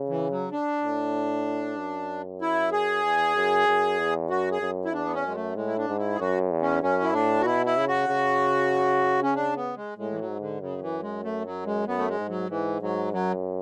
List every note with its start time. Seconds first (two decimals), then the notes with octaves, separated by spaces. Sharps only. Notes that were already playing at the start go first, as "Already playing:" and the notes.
Already playing: C#3
0.09 E3
0.30 F#3
0.52 D4
0.83 A2
1.77 F#2
2.41 E4
2.72 G#4
3.04 E2
3.35 F#2
3.67 F#2
3.98 E2
4.30 F#2 F#4
4.52 G#4
4.62 F#2
4.85 E4
4.93 E2 D4
5.05 B3
5.14 C#4
5.25 F#2 G#3
5.35 A3
5.56 A2 G#3
5.67 E4
5.78 D4
5.88 G#2
5.98 E4
6.15 G#4
6.20 F#2 F#4
6.51 E2
6.62 C#4
6.82 F#2 C#4
7.03 E4
7.13 A2 D4
7.41 F#4
7.46 B2 E4
7.66 E4
7.78 C#3
7.88 F#4
8.09 C#3
9.23 C#4
9.35 D4
9.56 B3
9.77 G#3
9.98 A2 G#3
10.11 E3
10.19 F#3
10.29 G#2
10.40 D3
10.61 F#2 C#3
10.82 E3
11.02 G#3
11.24 A3
11.45 F#3
11.66 G#3
11.87 F#2 B3
11.99 A3
12.08 G#3
12.18 G#2
12.29 F#3
12.50 G#2 E3
12.81 G#2 F#3
13.13 F#2 F#3